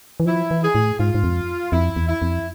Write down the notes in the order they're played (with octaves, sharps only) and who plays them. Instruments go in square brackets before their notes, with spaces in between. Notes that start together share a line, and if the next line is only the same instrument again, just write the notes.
[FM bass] E3
[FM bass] F3 [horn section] E4
[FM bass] E3
[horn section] G#4
[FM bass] A2
[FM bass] G#2 [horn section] F4
[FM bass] G#2
F2
[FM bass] F2 [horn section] E4
[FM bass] E2
[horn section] E4
[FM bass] F2